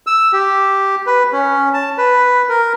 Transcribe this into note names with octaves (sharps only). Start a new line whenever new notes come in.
E6
G4
B4
C#4
A5
B4
A#4